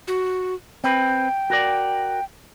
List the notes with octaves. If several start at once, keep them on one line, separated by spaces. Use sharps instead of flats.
F#4
C4 B4 G5
F#4 A#4 D5